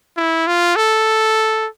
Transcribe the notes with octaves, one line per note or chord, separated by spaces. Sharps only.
E4
F4
A4